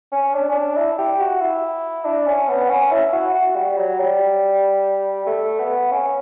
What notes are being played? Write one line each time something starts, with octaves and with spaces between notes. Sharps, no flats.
C#4
D4
C#4
D4
E4
G4
F#4
E4
D4
C#4
B3
C#4
E4
F#4
F#4
G3
F#3
G3
A3
B3
C#4